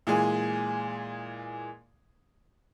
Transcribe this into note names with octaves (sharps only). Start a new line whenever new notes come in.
A#2 E3 G#3 G#4